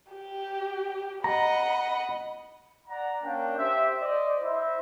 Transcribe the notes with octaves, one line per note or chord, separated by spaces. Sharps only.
G4
D#5 F#5 A#5 B5
D5 F#5 A#5
A#3 C#4 D4 G5
G4 C5 E5
C5 D5 D#5
E4 C5 D#5 E5